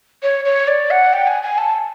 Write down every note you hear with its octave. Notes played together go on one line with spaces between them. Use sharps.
C#5
C#5
D5
F#5
G5
G#5
G#5
A5